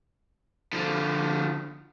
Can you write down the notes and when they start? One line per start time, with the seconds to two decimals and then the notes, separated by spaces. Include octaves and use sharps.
0.73 D3 F3